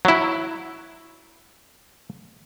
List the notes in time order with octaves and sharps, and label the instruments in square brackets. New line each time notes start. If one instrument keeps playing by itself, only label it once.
[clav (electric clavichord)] F#3 E4